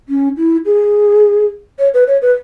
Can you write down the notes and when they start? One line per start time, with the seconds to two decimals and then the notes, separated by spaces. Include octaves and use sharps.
0.09 C#4
0.37 E4
0.65 G#4
1.79 C#5
1.94 B4
2.07 C#5
2.22 B4